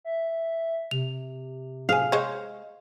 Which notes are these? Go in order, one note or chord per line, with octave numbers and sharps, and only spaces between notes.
E5
C3 F7
G#4 F5 G#5
G#3 C5 C#5